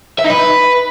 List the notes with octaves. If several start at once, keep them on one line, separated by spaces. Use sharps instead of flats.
E5
D#4
B4